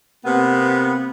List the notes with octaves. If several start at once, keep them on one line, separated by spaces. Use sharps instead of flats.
C3 A#3 B3